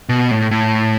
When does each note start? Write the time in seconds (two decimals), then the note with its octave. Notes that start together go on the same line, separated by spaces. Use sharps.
0.09 B2
0.31 A2
0.51 A2